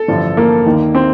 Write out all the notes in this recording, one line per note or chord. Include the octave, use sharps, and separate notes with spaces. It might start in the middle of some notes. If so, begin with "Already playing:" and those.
Already playing: A4
A1 G2 D3 F3
A#3
D#2 D#3
C4